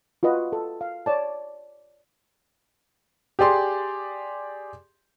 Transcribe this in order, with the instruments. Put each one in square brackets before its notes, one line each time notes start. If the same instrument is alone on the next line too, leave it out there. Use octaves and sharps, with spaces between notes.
[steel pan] F4 F#4 B4 D#5
A4
F5
C#5 D5 A5
[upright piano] G4 G#4 D5 C6